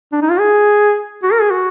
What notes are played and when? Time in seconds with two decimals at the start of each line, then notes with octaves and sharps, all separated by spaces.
0.12 D4
0.22 D#4
0.30 F4
0.40 G#4
1.23 F#4
1.32 A#4
1.41 G#4
1.51 F#4